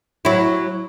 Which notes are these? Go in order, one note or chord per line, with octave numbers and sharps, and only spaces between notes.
F#3 E4